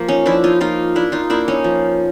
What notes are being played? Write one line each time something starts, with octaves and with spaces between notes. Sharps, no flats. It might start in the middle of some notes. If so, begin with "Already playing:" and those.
Already playing: F3 A#3
C#4 D#4
F3 D4 E4
D#4 F4
A#3 D#4 F4
A#3 D4 E4
D#4 F4
A#3 D4 E4
C#4 D#4
F3